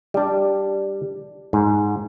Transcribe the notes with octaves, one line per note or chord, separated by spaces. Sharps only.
G3 D4
G#2